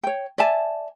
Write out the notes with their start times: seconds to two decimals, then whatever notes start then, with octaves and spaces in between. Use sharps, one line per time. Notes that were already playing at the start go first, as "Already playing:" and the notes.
0.03 C#5 G5
0.38 D5 E5 G#5 A5